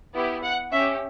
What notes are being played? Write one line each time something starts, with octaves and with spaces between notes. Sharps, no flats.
B3 E4 G4
F#5
C#4 G4 E5